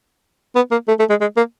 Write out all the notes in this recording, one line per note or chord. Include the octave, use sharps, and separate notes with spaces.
B3
A#3
A3
A3
G#3
G#3
A#3